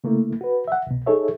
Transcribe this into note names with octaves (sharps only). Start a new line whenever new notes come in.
C#3 A3 A#3 E4
F#4 B4
E5 F#5
C2 B2
D#4 G#4 A4 C#5 E5